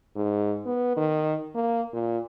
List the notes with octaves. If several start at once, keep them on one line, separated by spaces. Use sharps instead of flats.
G#2
B3
D#3
A#3
A#2